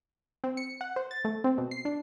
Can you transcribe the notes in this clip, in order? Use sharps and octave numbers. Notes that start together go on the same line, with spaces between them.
C4
C#7
F#5
C5
A6
A3
C4
B2
C7
D4